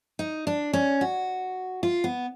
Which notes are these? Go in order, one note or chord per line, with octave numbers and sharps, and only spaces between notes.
D#4
D4
C#4
F#4
F4
B3